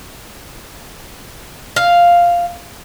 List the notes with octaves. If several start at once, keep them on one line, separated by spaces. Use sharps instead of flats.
F5